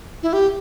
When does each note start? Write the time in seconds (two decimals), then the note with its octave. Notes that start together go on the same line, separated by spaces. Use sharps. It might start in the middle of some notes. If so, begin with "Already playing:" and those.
0.23 E4
0.33 G4